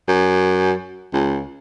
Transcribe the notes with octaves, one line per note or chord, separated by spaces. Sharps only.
F#2
C#2